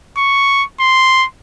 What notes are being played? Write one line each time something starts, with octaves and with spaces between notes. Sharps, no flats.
C#6
C6